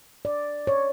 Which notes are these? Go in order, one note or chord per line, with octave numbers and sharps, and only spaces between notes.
D5
C#5